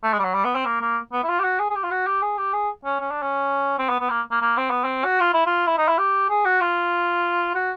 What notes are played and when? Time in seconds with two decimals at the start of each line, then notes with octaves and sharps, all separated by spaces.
0.03 A3
0.13 G#3
0.19 G3
0.24 F#3
0.34 G3
0.44 B3
0.55 C4
0.65 A#3
0.81 A#3
1.12 B3
1.23 E4
1.28 F4
1.39 G4
1.44 F#4
1.59 G#4
1.70 G#4
1.75 G4
1.83 F4
1.91 F#4
2.07 G4
2.22 G#4
2.38 G4
2.53 G#4
2.85 C#4
3.00 C#4
3.11 D4
3.22 C#4
3.79 C4
3.89 B3
4.00 B3
4.10 A#3
4.31 A#3
4.41 A#3
4.57 C4
4.70 B3
4.84 C4
5.04 F#4
5.20 F4
5.33 E4
5.46 F4
5.67 E4
5.78 D#4
5.88 E4
5.98 G4
6.30 G#4
6.45 F#4
6.61 F4
7.55 F#4